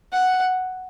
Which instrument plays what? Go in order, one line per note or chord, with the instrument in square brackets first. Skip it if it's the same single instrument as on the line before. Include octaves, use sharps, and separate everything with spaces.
[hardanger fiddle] F#5